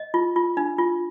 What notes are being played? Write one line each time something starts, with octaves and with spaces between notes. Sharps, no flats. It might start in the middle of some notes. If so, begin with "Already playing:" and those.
Already playing: D#5
F4
F4
D4
F4